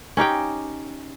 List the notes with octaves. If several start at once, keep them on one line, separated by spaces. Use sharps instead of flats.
C#4 D#4 G4 G5